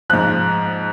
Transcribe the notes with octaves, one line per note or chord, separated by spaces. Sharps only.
G#2 F3 F#6